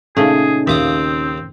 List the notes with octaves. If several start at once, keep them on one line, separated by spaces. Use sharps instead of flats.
A#2 C#3 A3 C#4 D#4 G#4
D#2 C4 F4 E5 D6 D#6